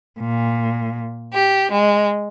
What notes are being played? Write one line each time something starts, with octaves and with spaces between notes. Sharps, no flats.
A#2
G4
G#3